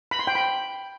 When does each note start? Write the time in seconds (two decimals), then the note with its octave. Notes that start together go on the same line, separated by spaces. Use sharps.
0.11 B5
0.19 C6
0.27 G5
0.35 B5